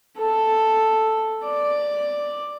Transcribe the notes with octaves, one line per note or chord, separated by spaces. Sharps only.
A4
D5